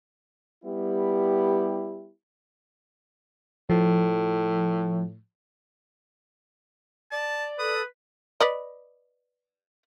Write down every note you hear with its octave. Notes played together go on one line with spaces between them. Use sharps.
G3 B3 E4 G4
A2 F3
D5 A5
A4 B4 D#6
B4 D5 D#5